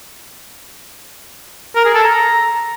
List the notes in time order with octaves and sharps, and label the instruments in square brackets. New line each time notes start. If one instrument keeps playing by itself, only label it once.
[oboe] A#4
G#4
A4
A#5